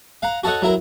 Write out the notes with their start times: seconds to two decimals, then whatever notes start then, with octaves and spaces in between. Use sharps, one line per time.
0.22 F5 F#5 A#5
0.43 F#4 A4 C#5 D#5 F#5
0.62 F#3 E4 A#4